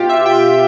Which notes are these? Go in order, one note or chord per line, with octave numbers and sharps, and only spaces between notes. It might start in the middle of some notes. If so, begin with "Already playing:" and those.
Already playing: B2 F4 G4
E5
G5